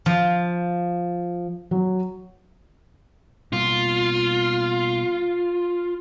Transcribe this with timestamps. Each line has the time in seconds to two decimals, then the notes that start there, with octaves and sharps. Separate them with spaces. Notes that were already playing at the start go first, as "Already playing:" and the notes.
0.06 F3
1.71 F#3
3.53 B2 G3 A#3 F4